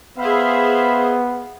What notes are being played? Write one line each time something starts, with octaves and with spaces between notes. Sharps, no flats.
B3 G#4 C5 E5 F5 B5